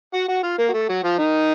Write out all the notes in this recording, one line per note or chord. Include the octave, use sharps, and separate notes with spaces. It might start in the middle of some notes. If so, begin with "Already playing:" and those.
F#4 F#5
F#4 F#5
F4 F5
A#3 A#4
F#4
A3 A4
F#3 F#4
F3 F4
D#3 D#4